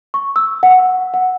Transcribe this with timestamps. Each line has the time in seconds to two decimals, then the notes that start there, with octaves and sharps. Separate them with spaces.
0.14 C#6
0.36 E6
0.63 F#5
1.14 F#5